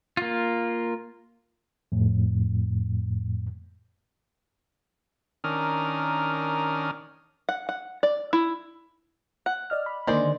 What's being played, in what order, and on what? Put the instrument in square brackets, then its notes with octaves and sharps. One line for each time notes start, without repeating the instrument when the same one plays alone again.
[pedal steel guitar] A#3 F4
[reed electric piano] F2 A2
[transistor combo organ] D#3 C#4 D4 A#4 D#6 F6
[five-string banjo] F#5
F#5
D5
E4
F#5
[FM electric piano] D5 D#5 F6
B5
[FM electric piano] D3 D#3 A#3 [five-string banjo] G#3 C5 D5